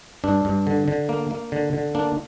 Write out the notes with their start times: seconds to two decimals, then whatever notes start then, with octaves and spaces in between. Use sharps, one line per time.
0.24 G2 D4
0.45 G2
0.67 D3
0.88 D3
1.09 A#3
1.31 A#3
1.52 D3
1.73 D3
1.95 A#3 D4